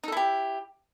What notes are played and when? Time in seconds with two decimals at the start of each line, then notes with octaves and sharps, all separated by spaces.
0.03 D#4
0.08 A4
0.12 E4
0.17 G4